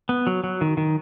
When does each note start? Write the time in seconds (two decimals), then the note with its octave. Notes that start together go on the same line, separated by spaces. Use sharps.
0.09 B3
0.27 F#3
0.44 F#3
0.61 D#3
0.77 D#3